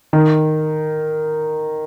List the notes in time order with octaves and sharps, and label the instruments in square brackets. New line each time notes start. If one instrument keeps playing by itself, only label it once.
[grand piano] D#3